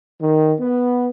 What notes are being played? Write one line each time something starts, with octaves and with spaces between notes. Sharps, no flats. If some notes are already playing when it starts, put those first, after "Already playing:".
D#3
B3